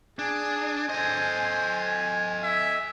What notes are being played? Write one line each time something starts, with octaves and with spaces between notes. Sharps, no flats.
D4 G#4 G#5
A4 C5 D#5
E5